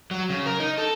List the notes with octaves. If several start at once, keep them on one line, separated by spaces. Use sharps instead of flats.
F#3
C#3
A#4
D#4
A4